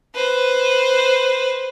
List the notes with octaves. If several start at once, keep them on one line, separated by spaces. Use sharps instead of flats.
B4 C5